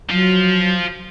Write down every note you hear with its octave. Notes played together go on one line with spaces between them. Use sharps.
F3 F#3 F4